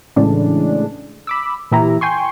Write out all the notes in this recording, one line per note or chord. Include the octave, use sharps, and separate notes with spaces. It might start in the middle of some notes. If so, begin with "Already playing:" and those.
A2 C#3 E3 G#3 D4
B5 D6 E6
A#2 E3 E4 G4 A#5
G5 G#5 C6 C#6